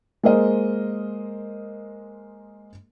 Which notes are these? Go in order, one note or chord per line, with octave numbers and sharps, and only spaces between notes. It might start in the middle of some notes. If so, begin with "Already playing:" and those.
G#3 A#3 A#4 C5 D#5